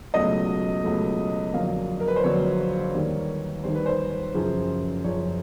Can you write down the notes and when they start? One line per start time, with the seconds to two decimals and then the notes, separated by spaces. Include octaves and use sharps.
0.14 C#2 B2 F#3 A3 D#5
0.84 C#2 B2 F#3 A3
1.53 F2 D3 F#3 A#3 F5
2.00 A#4
2.08 B4
2.16 C5
2.24 F2 D3 F#3 A#3 C#5
2.94 D#2 D#3 G3 A#3
3.64 D#2 D#3 G3 A#3 C5
3.75 B4
3.86 C5
4.34 F#2 C#3 F3
5.04 F#2 C#3 F3 C#5